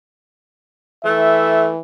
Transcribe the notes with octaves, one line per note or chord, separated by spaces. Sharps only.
E3 A3 E5